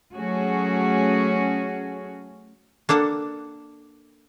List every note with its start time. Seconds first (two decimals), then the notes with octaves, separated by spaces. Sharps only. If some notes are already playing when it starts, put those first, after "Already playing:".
0.15 F#3 A3 C#4 F#4 G#4
2.89 A#3 D4 A4 F#5